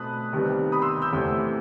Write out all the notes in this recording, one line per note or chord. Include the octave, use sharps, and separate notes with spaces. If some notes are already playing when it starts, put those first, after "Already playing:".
Already playing: B2 A3 C4 A5 B5 D#6 F#6
C2 C3 D#3 G3 B3
B5 D#6
C6 E6
E6 G6
E2 C3 E3 A3